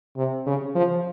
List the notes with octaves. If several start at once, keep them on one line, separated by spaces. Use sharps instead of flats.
C3
C#3
F3